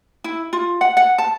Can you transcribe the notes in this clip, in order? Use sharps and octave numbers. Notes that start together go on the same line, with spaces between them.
E4
F4
F#5
F#5
A5